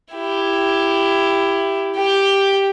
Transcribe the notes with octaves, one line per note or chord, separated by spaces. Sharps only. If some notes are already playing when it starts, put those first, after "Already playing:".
E4 G4
G4 G5